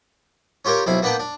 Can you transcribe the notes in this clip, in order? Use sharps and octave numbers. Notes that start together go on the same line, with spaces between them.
C#4 F4 G4 A#4 C#5
B1 C3 E4 F5
A#3 B3 D4 B4 G5 A5
D4